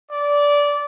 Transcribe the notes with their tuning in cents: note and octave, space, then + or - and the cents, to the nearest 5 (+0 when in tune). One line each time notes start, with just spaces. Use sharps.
D5 -15